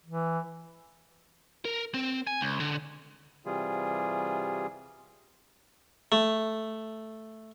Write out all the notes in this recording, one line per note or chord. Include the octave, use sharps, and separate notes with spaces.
E3
A#4
C4
G#5
C#2
D3
C3 E3 G3 F4 G#4
A3